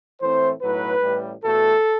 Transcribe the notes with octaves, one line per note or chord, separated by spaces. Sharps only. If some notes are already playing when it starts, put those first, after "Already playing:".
A2 E3 A3 C4 C5
B1 A2 F#3 B4
A1 A2 G3
E2 B2 A3 A4